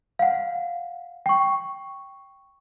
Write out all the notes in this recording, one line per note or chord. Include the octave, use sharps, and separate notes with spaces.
F5 F#5
G5 C#6